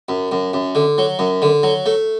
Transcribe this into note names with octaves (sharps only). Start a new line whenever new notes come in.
F#2
F#2
F#2
D3
F#3
F#2
D3
F#3
A3